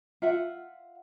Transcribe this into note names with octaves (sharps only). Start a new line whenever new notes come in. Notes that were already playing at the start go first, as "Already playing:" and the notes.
F4 E5 F#5